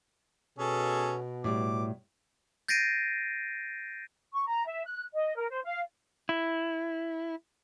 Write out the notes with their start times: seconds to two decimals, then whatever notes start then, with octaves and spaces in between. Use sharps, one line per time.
0.58 B2 C#4 G#4 A4
1.44 A2 G3 D6
2.68 G6 A6 A#6 C7 D7 D#7
4.34 C#6
4.47 A#5
4.66 E5
4.85 F#6
5.13 D#5
5.36 A#4
5.49 C5
5.64 F5
6.29 E4